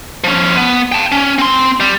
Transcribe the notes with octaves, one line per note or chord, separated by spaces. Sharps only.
F3 C#4
B3
G5 A5
C#4
C4 C6
G3